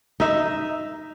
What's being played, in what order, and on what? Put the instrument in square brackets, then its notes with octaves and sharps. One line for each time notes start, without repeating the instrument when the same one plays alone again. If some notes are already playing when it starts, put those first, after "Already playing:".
[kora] D#4 E5